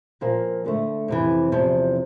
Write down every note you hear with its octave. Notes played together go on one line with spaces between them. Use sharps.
A#2 F3 A#3
D2 D3 A3
F2 C3 E3
E2 C3 F3